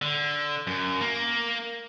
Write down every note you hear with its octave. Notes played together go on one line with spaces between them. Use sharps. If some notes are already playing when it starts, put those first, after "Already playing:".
D3
F#2
A#3